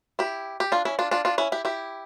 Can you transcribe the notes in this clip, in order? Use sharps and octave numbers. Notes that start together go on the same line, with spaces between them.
E4 G4
G4
D4 F4
C#4 E4
D4 F4
D4 F4
D4 F4
C#4 E4
E4 G4
E4 G4